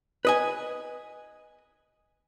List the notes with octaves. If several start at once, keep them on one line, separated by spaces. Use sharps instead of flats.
B4 D#5 G#5